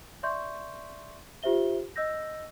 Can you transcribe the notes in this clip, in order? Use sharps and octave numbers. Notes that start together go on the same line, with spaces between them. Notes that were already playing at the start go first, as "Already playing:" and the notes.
D5 E5 C6 C#6 G6
F4 G4 C5 E5 G7
D#5 E6 G6 A#6